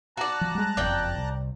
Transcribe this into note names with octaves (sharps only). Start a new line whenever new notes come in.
F#4 D5 A5 A#5 F#6
F3
G3 G#3
F#1 F2 D5 G5
C2